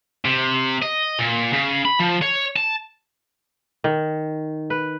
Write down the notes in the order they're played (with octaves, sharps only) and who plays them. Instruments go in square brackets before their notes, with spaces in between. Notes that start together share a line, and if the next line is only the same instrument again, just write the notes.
[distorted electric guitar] C3
D#5
A#2
C#3
B5
F3
C#5
A5
[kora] D#3
B4